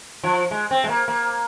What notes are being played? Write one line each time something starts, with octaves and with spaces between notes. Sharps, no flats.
F3
G#3
C4
G#3
A#3
A#3